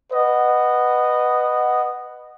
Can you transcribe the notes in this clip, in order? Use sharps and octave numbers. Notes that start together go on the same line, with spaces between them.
B4 D#5 F#5